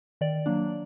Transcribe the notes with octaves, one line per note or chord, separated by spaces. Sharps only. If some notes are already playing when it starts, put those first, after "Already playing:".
D#3 D5
F#3 A#3 D4